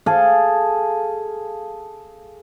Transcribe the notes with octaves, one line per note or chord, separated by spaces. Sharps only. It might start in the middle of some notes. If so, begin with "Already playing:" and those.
G#4 A4 F5